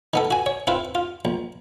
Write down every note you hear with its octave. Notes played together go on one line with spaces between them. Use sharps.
D#3 B3 A4
F#4 G#5
C#5
C4 E4 F4 B4
F4
A#1